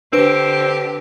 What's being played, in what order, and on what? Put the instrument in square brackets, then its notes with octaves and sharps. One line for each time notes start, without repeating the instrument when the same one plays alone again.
[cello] D3 G4 [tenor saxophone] C4 [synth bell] D4 B4 D7